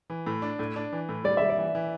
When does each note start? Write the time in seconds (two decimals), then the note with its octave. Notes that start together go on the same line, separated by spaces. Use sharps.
0.10 E3
0.27 A2
0.42 D4
0.59 A2
0.76 D4
0.92 E3
1.09 A2
1.24 G3 D5
1.37 G3 E5
1.50 D5
1.58 E3
1.75 E3